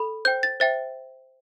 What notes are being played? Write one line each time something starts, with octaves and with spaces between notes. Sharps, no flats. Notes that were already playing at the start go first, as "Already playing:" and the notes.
Already playing: A4 B5
C5 G5 G6
A6
C5 E5 G5 A6